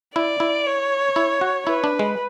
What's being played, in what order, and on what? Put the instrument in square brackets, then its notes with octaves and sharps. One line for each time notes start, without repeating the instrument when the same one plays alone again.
[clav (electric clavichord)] E4 [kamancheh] D5
[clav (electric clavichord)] E4
[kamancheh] C#5
[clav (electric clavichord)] E4
F#4
[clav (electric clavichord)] E4 [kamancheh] B4
[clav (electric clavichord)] D4
G#3